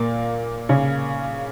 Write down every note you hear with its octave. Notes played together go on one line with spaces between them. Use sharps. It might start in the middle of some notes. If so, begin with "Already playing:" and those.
Already playing: A#2 A#3
C#3 C#4